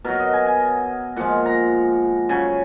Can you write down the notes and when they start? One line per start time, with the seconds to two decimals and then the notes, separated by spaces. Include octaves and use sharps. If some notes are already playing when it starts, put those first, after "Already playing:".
0.04 B2 F#3 A#4
0.19 D#5
0.33 G#5
0.46 G#5
1.16 A#2 F3 G#3 F#5
1.46 A#5
2.29 C#3 F#3 G#5